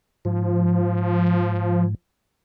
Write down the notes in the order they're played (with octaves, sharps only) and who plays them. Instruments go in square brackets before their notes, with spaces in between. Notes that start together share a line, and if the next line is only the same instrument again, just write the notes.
[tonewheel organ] G#2 [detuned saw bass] F3